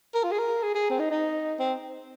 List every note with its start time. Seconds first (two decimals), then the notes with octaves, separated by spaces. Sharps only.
0.15 A#4
0.24 F4
0.32 G#4
0.39 A#4
0.63 G#4
0.75 G#4
0.90 C4
0.99 D#4
1.10 D#4
1.59 C4